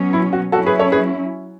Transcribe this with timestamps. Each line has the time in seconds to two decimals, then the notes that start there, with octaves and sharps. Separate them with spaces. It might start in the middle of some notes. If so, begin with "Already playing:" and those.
Already playing: B2 F#3 C#4
0.13 E4
0.33 F#4
0.52 F#3 C#4 E4 F#4 A4
0.66 G#4 B4
0.79 A4 C#5
0.92 G#4 B4